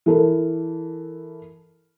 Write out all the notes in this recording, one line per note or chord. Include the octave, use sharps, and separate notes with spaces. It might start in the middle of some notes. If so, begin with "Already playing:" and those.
E3 A4 A#4